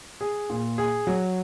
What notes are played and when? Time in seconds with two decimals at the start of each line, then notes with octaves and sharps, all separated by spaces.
0.21 G#4
0.50 A#2
0.78 G#4
1.07 F#3